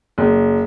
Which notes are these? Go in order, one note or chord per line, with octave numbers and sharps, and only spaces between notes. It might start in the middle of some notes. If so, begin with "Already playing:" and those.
F#1